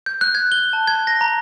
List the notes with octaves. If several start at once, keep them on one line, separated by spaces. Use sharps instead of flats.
G6
F#6
G#6
G7
A5
G#6
A#6
A#5